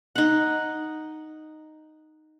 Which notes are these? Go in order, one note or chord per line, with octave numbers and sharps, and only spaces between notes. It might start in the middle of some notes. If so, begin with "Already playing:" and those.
D#4 F#5